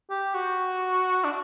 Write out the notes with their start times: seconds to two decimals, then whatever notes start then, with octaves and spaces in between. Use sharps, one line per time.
0.10 G4
0.34 F#4
1.24 D4